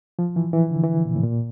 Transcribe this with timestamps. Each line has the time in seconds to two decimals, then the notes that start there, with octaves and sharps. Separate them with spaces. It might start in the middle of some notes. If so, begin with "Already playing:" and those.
0.19 F3
0.36 E3
0.53 E3
0.70 D3
0.84 E3
1.05 A#2
1.10 C3
1.16 A2
1.23 A#2